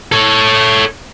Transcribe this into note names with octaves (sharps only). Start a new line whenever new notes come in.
A4 C#5